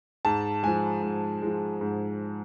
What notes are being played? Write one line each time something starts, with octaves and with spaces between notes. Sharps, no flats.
G#2 A5
F3 G#3 G#5
G#2
F3 G#3
G#2